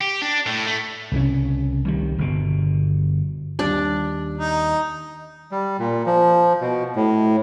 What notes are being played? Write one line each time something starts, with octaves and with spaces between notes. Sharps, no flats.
G4
D4
A2
A3
C2 C#3 C#4
C2 D#3 G3
G1 B2
D#2 G3 D4 D5
D#4
G3
A#2
F3
B2
A2